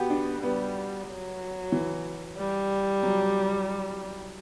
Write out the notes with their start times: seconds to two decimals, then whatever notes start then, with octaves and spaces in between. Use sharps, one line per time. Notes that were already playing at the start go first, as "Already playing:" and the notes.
Already playing: B3 F#4 G4
0.10 D4
0.42 G3 B3
1.08 F#3
1.72 E3
2.38 G3
3.03 F#3